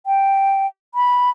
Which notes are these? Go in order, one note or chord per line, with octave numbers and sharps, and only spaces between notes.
G5
B5